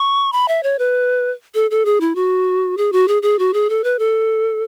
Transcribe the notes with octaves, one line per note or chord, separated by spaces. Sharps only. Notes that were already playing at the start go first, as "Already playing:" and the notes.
Already playing: C#6
B5
E5
C#5
B4
A4
A4
G#4
E4
F#4
G#4
F#4
G#4
G#4
F#4
G#4
A4
B4
A4